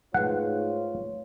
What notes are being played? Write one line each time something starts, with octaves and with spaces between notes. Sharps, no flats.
G#2 A3 F4 B4 C#5 F#5 F#6